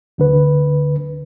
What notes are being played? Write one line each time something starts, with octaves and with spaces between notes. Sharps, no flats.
D2 D3 B4